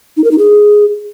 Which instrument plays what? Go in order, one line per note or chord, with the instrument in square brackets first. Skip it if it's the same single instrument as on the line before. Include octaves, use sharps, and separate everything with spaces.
[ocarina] D#4
A#4
D#4
G#4